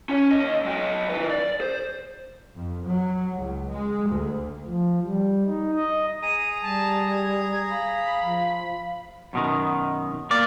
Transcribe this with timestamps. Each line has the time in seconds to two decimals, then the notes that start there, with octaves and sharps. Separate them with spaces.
0.09 C#4 C#5
0.30 D#2 D#5
0.65 F#3 D#5
1.10 D#3 B4
1.29 D5
1.61 C5
2.56 F2
2.87 F#3
3.39 C#2
3.69 G#3
4.10 D2
4.66 F3
5.04 G3
5.46 D#4
5.76 D#5
6.22 G#4 A#5 D#7
6.62 G3 A5
7.10 G#6
7.70 F5 B5
8.22 F3
9.33 F#2 B2 D#3
10.31 A#3 D5